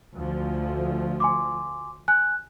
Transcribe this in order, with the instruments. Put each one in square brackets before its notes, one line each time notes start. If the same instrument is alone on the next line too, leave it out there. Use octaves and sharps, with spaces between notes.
[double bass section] D2 F3
[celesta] G#5 C6 D6
G#5 F#6